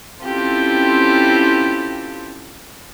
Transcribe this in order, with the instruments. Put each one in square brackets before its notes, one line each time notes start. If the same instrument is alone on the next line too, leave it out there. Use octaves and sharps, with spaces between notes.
[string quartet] C4 C#4 E4 F4 G4 A4